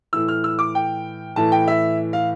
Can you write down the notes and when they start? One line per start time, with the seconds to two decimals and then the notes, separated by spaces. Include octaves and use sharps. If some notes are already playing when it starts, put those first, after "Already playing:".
0.13 A2 E3 E6
0.28 F6
0.44 E6
0.59 D6
0.75 G5
1.36 A2 E3 A5
1.52 G5
1.68 E5
2.13 F5